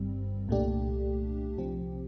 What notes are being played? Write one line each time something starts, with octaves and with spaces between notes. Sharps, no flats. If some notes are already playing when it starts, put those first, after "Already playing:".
Already playing: G1 G2 D#3 G3 C4
C2 A#2 A3 D4 G4
C2 C3 F3 C4 G4